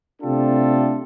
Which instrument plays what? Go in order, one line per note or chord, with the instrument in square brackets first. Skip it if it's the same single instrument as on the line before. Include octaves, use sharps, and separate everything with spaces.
[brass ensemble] C3 A3 D4 F4 G4 A4